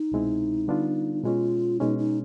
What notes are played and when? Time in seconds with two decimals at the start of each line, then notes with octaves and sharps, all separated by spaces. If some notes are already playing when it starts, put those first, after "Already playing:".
Already playing: D#4
0.12 C2 B2 G#3 C4 E4
0.68 D3 G3 B3 D4 F4
1.24 B2 G#3 C#4 F4
1.80 B2 G#3 C#4 D#4
1.98 D#4